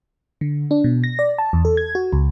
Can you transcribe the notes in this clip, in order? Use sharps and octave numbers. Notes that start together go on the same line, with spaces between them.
D3
D4
B2
A#6
D5
A5
E2
A4
G#6
F#4
C#2